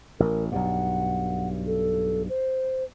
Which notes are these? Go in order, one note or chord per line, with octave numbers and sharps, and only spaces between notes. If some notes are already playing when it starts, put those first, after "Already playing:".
A1 A#4
B1 G2 F#5
A4
C5